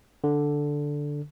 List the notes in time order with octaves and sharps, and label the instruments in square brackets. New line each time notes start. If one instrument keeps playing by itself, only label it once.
[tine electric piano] D3